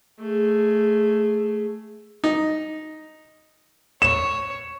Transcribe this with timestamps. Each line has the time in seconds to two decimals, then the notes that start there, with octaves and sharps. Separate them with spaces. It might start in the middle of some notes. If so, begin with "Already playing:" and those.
0.20 A3 G#4
2.24 D#4
4.02 C#5 E7